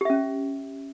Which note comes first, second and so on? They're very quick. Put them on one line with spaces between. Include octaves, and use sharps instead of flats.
G4 E5 C#4